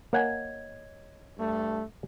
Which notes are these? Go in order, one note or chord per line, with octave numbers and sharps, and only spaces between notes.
A#3 C#5 D#5 F#5 G#5 G#6
G2 A3